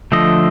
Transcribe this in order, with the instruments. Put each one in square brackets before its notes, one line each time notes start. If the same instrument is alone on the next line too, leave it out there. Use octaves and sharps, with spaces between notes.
[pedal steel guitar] D3 F3 A3 D#5